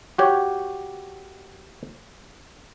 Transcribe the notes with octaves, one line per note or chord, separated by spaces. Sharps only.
F#4 G4 C#5